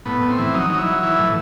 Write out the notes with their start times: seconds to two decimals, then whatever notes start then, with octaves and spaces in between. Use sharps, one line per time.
0.06 A2 B3
0.22 A2
0.30 C4
0.39 E3
0.54 F#3 D#4
0.70 F#3 D#4
0.79 E4
0.86 F#3
1.03 E3 E4
1.19 A2